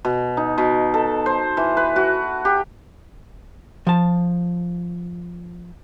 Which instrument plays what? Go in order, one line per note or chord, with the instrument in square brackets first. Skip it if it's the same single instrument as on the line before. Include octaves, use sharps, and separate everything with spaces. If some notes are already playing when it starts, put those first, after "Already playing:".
[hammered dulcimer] B2
D#4
B2
A4
C5
E3
B4
F#4
G4
[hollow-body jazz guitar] F3 A5